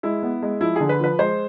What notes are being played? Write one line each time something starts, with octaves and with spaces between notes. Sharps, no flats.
G#3 E4
B3
G#3
F3 E4
D3 G#4
B4
F3 B4
G#3 C5